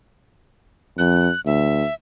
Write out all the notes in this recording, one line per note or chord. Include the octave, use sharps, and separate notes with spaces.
F2 F#6
D2 E5